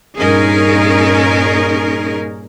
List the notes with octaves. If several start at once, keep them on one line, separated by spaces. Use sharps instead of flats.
G2 A#2 C#4 D#4 G#4 A#4